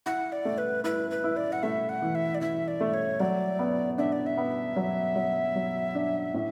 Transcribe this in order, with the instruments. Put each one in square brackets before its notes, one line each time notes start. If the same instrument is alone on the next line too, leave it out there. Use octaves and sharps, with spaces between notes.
[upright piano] E4 [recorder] F#5
[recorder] D5
[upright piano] A3
[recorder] B4
[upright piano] E4 [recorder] B4
[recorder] B4
[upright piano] E4
[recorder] D5
F#5
[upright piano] A3 [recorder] E5
[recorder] F#5
[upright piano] E3
[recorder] E5
D5
[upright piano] E3 [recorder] E5
[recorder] D5
[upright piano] A3
[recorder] C#5
[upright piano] F#3 [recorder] D5
[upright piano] B3
[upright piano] D4 [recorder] E5
[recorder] D5
E5
[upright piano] B3
F#3
F#3
F#3
D4
A2